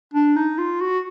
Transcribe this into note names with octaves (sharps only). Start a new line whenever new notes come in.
D4
D#4
F4
F#4